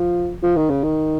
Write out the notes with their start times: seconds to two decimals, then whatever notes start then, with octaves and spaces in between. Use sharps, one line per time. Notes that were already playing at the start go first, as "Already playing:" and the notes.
Already playing: F3
0.43 F3
0.56 D#3
0.70 C#3
0.83 D#3